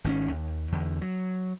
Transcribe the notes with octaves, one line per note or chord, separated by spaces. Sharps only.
G#1 D#3 C4 C#4
D#2
E2 D3
F#3